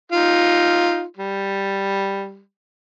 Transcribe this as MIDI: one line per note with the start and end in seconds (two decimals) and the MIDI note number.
0.12 1.02 63
0.12 1.02 65
1.17 2.40 55